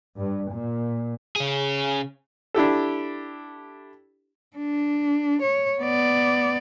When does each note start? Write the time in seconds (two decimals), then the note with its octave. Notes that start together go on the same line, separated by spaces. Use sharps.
0.18 G2
0.52 A#2
1.36 C#3 G#4
2.54 D4 E4 G4 A4
4.57 D4
5.42 C#5
5.81 B3 D5